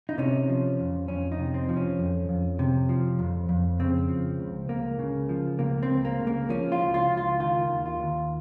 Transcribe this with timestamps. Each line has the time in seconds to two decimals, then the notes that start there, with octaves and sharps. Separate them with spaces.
0.09 D#4
0.18 C3 C#4
0.49 F3
0.79 F2
1.08 F2 C#4
1.32 D#4
1.38 C3
1.54 C4
1.69 F3
1.77 C#4
1.99 F2
2.29 F2
2.59 C3
2.89 F3
3.19 F2
3.49 F2
3.80 C#3 C4
4.09 F3
4.39 C#2
4.69 C#2 A#3
4.99 C#3
5.29 F3
5.59 C#2 A#3
5.83 C4
5.89 C#2
6.05 A#3
6.20 C#3
6.27 A#3
6.49 F3 C#4
6.72 F4
6.79 C#2
6.94 F4
7.09 C#2
7.17 F4
7.39 D#3 F4
7.69 D#2
7.86 F4
8.00 D#2